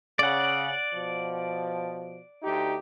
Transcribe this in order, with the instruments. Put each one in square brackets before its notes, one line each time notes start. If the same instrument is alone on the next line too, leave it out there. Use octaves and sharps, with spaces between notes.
[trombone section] C#3 [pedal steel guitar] D5 F#5
[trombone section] B2 F3
D2 D#4 G4